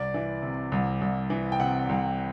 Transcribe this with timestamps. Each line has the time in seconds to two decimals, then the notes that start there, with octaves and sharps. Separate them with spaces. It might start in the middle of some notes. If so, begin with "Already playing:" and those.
Already playing: C2 D5
0.14 E3
0.43 C3
0.72 C2
1.01 C2
1.30 E3
1.52 G5
1.59 C3 F#5
1.89 C2